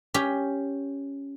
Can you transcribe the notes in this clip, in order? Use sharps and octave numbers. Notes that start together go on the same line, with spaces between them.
C#4 G4